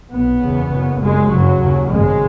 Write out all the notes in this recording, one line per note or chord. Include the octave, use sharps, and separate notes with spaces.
B1 B2 B3
F#1 E2 C#3
F#1 F#2 C#3
F#1 F#2 C#3 G#3
F#1 F#2 C#3 F#3
D#2 C#3
G#1 F#2 C#3 G#3